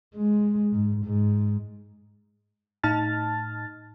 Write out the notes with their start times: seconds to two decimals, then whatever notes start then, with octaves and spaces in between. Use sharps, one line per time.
0.16 G#3
0.73 G#2
1.05 G#2
2.83 A2 D#4 A5 F6 A6